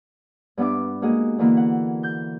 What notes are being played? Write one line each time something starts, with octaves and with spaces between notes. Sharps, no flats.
G2 B3 D4 E5 D6
G#3 A#3 F#4 G#4 D#5
D3 E3 A#3 E4
F#5
G6